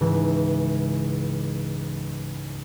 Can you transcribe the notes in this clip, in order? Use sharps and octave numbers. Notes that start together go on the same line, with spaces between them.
C#2 G#2 C#3 E3